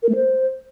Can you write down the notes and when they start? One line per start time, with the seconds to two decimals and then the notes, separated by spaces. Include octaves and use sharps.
0.03 A#4
0.09 A3
0.15 C5